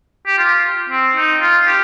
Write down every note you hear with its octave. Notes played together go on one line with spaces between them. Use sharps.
G4
F4
C4
D#4
F4
G4